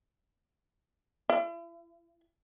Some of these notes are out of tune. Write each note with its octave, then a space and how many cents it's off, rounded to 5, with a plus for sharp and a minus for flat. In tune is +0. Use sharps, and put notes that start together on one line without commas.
E4 +40